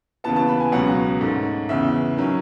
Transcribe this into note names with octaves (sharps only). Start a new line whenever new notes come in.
D#2 C#3 E3 B3 A5
A5
B5
G#5
C#2 B2 F#3 C#4 F#5
G#2 D#3 A3 C#4
E2 C#3 E3 E5
D#3 F#3 C#4